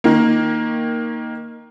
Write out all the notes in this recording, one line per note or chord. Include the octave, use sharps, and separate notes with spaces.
D#3 A#3